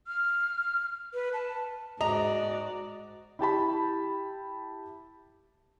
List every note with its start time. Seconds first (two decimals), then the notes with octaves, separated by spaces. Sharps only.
0.07 F6
1.14 B4
1.33 A5
2.01 G#2 F#4 D5 D#5 A#5
3.39 E4 G4 A5 B5